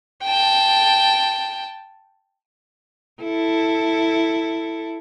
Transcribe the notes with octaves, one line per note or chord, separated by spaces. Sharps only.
G5 A5
E4 A4